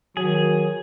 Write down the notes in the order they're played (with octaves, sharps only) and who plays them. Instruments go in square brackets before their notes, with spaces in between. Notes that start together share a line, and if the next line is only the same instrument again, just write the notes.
[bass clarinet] D#3 [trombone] F#3 [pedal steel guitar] G#4